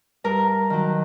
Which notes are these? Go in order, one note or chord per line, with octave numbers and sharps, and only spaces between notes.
G2 A#4
D#3 F#3